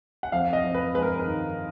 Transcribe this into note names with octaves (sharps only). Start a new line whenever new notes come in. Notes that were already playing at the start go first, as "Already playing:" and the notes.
F#5
F2 F5
D#5
F2
B4
G#3 B4
A#4
A#4
D#3